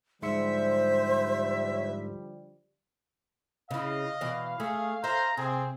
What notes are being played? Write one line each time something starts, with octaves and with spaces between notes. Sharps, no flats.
G#2 D3 F3 G3 C5 E5 C6 C#7
C#3 E4 D#5 F5
B2 E3 D5
A3 G#4
C5 E5 A#5
C3 C4 G#4